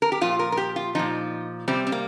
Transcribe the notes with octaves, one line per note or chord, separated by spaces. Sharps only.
A#4
G4
A#2 F3 F4
A#4
A#4
G4
F4
A#2 F3 D#4
C3 G3 C4
C4
A#3